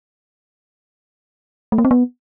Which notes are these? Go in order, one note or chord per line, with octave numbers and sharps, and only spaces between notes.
A3
A#3
C4
B3